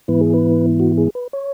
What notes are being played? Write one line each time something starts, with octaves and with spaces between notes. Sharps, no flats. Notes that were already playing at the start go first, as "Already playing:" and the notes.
G#2 E3 B3 E4 B4
G#4
B4
F#4
G#4
B4
C#5